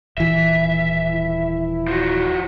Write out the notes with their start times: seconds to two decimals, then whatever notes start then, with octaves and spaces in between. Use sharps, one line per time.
0.18 D#1 E3 E5
1.10 E4
1.88 F3 F#4